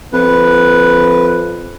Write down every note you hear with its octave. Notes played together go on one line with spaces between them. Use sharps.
F2 B4